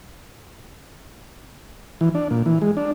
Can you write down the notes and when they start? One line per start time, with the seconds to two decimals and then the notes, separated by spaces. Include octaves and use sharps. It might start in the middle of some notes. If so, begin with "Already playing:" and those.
2.01 E3
2.15 D4
2.31 A#2
2.46 E3
2.62 G#3
2.77 D4